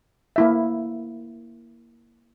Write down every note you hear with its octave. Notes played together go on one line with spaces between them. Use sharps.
A#3 E4 E5